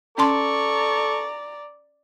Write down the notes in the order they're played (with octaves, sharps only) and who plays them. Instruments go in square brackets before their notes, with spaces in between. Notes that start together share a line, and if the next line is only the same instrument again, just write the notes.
[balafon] C#4 A5 C6 [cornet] A4 [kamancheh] D5 A#5 [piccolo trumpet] C#6